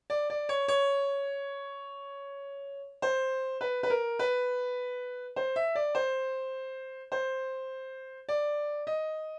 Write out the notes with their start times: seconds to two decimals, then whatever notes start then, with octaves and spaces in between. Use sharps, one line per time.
0.10 D5
0.30 D5
0.49 C#5
0.68 C#5
3.02 C5
3.61 B4
3.83 B4
3.90 A#4
4.19 B4
5.36 C5
5.56 E5
5.75 D5
5.95 C5
7.12 C5
8.29 D5
8.87 D#5